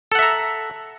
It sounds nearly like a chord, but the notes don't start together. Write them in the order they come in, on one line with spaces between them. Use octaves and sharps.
A4 F#5 E5 A#5